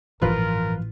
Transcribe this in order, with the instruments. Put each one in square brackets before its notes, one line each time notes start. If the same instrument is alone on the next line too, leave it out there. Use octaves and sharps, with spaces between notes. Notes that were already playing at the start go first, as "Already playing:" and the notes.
[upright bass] A1 A#2 [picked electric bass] G2 E3 F3 [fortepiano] F4 B4 [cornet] A#4